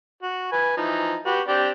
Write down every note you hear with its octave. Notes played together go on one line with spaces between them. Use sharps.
F#4
B4 G#5
E3 F3 D#4
F#4 G4 B4
C4 D4 G4